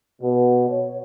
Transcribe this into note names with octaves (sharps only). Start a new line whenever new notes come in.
B2
C#5